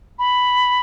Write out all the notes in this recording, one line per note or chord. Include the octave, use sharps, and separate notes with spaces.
B5